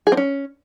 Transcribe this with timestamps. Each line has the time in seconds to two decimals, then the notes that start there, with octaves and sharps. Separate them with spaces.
0.07 G#4
0.12 C4
0.17 C#4